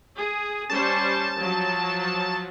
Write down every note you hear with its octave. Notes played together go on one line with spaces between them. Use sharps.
G#4
G3 C#4 C5 A5
F3 F#3